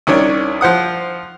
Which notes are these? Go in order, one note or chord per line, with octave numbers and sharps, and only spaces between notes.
C2 D#3 C#4 D4 C#5
F3 C5 F#5 D#6